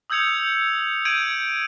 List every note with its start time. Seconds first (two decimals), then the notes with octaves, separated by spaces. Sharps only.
0.10 D#6 E6 G6 G#6 C#7 F7
1.05 G6 G#6 D7 D#7 F#7